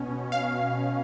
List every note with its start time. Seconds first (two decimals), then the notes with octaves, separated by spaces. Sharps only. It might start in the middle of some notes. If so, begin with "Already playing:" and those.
Already playing: B2 C#4
0.32 F5